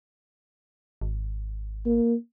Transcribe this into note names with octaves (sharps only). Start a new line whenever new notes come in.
G#1
A#3